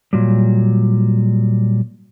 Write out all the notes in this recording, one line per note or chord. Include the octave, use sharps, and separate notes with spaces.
A#2 F#3 G3